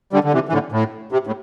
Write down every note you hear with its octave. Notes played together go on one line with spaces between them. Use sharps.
D3 G3
D3
C3 E3
E3
A2 D3
A2
C3
A2